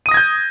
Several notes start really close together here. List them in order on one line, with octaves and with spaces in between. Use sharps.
D#7 D#6 A#6 G#6 G6